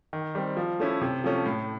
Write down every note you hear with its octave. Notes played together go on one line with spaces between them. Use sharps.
D#3
G3 C4
F3
A3 C#4 E4
C3
F3 A3 C#4
A2